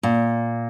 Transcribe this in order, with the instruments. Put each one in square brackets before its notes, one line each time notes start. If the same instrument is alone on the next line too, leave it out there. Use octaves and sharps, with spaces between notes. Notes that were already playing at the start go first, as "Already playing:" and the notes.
[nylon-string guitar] A#2